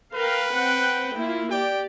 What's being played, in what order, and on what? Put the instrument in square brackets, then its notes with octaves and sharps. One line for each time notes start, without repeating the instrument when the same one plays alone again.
[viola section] A#4 F5 G5 [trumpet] B4
[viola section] C4 F#5 G5
A#3 E4 F4
[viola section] G4 D5 [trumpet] G5